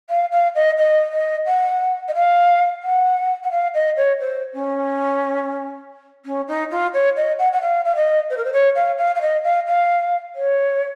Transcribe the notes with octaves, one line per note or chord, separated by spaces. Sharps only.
F5
F5
D#5
D#5
D#5
F#5
D#5
F5
F#5
F#5
F5
D#5
C#5
C5
C#4
C#4
D#4
F4
C#5
D#5
F#5
F#5
F5
F5
D#5
C5
A#4
C5
C#5
F5
F5
F5
D#5
F5
F5
C#5